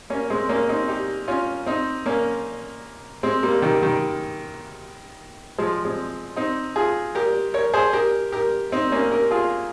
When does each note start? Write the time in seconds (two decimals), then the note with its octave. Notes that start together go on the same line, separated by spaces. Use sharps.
0.10 A#3 C#4
0.30 G#3 C4
0.49 A#3 C#4
0.69 C4 D#4
0.88 D#4 G4
1.28 C#4 F4
1.66 C4 D#4
2.06 A#3 C#4
3.23 G#3 C4
3.43 G3 A#3
3.62 D#3 G3
3.82 D#3 G3
5.58 F3 G#3
5.85 G#3 C4
6.36 C4 D#4
6.76 F4 G#4
7.15 G4 A#4
7.54 A#4 C#5
7.74 G#4 C5
7.93 G4 A#4
8.32 G4 A#4
8.72 C4 D#4
8.92 A#3 C#4
9.11 G4 A#4
9.31 F4 G#4